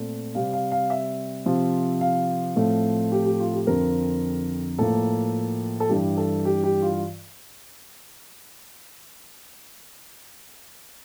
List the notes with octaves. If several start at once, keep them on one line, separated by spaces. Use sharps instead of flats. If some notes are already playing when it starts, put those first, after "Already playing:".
Already playing: A#2 A3 C4
C3 G3 C4 F5
F5
F5
E5
C3 F3 C4
F5
A2 F3 A3 C4
G4
G4
F4
G4
F2 D3 F3 C4 A#4
A2 F3 A#3 A4
A4
G2 E3 G3 G4
A4
G4
G4
F4